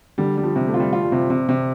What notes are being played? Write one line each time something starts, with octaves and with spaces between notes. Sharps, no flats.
D3 G3
G3
F3
C3
A3
F4
G3
F3 F4
G3
C3
C3
C3